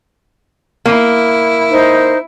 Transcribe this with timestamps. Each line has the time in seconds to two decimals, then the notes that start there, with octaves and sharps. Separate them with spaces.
0.86 A#3 E4
1.71 D#4 C5